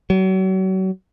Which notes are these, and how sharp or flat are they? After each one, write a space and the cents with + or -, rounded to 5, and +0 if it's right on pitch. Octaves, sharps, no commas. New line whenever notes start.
F#3 +35